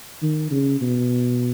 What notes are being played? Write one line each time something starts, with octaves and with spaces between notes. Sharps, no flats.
D#3
C#3
B2